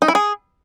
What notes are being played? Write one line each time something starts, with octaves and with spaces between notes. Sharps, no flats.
D#4
E4
G#4